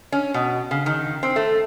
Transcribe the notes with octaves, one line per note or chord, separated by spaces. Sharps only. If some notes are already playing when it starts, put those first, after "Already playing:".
C#4
B2
C#3
D#3
C4
A3